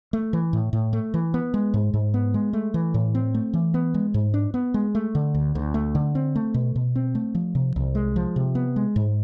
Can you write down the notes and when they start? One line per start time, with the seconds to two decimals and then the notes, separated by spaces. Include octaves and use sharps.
0.13 A3
0.33 E3
0.53 A2
0.73 A2
0.93 A3
1.14 E3
1.34 B3
1.54 G#3
1.74 G#2
1.94 G#2
2.14 B3
2.34 G#3
2.53 A3
2.74 E3
2.94 A2
3.15 C4
3.34 A3
3.54 E3
3.74 B3
3.94 G#3
4.14 G#2
4.34 D4
4.54 B3
4.74 G#3
4.95 A3
5.15 D3
5.35 D2
5.55 D2
5.74 A3
5.95 D3
6.15 C4
6.36 A3
6.54 B2
6.76 B2
6.96 C4
7.15 A3
7.35 F3
7.55 C3
7.76 C2
7.95 G#3
8.16 F3
8.36 C3
8.55 B3
8.76 G#3
8.96 G#2